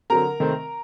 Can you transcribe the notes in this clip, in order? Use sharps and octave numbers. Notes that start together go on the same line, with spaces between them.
D3 F#3 C4 A#4 A#5
C3 D#3 A3 C4